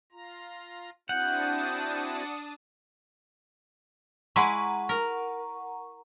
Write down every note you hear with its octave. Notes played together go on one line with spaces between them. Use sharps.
F4 A#5
C4 D4 E4 F#4 F#5 A5 D#6 G6
G#3 E4 F#5 A#5 C#6
A#4